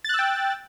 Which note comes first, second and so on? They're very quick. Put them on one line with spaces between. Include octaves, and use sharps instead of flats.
A6 F#6 E6 G5